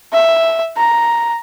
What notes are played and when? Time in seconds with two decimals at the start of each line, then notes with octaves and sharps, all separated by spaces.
0.13 E5
0.77 A#5